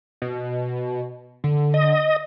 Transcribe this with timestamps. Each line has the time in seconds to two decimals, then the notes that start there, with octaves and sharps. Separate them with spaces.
0.22 B2
1.44 D3
1.74 D#5